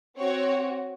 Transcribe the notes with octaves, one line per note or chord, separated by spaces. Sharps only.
C4 F#4 C#5